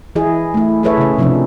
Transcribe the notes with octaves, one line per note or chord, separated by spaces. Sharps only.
E3 E4 G#4 D#5
A3 E4
E4 G#4 A4 B4 C#5 E5
C#3 G#4
C3 F3 C4 D4 D#4